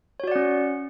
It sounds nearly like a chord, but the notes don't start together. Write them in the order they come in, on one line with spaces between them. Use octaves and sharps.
C#5 F#4 D5 F#5 C#4